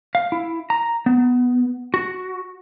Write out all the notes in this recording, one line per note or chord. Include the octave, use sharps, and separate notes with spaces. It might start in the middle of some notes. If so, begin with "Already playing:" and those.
F5
E4
A#5
B3
F#4